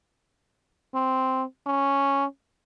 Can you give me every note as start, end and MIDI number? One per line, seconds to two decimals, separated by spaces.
0.95 1.44 60
1.67 2.25 61